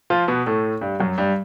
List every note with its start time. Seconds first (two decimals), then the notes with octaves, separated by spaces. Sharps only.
0.10 F3 F4
0.28 B2 B3
0.46 A2 A3
0.81 G2 G3
1.00 F#2 F#3
1.18 G2 G3